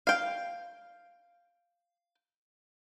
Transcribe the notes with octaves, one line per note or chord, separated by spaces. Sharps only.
F5 G5